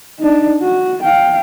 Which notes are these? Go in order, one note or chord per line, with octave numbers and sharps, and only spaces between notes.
D4 D#4
F#4
F5 G5